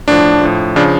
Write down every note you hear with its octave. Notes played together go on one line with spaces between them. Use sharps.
A2 F3 D4
A2 F3
C#3 F3 D4